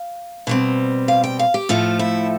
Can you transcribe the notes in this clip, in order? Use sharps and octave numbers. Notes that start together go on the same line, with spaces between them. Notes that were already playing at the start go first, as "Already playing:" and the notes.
Already playing: F5
B2 G3 C4
F5
G5
F5
G4
A2 F3 A3 F4
E4